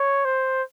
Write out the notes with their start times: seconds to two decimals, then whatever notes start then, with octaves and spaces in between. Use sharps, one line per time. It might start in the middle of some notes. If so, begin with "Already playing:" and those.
Already playing: C#5
0.25 C5